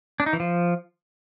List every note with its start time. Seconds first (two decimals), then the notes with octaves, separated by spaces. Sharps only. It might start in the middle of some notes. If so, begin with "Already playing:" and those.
0.20 D4
0.26 D#4
0.33 E3
0.40 F3